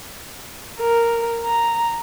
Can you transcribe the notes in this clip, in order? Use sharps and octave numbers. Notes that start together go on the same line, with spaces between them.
A#4
A#5